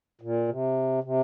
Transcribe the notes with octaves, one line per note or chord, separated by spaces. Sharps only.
A#2
C3
C3